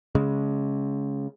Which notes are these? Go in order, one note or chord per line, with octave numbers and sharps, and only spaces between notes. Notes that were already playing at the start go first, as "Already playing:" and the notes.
C#3 G#3